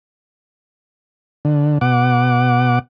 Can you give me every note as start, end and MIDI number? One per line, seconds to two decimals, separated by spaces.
1.45 1.78 50
1.81 2.79 47
1.81 2.79 78
1.81 2.79 86